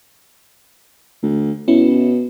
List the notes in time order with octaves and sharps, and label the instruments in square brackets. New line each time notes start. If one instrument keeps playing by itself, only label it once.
[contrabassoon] D2
[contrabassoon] B2 [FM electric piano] C#4 E4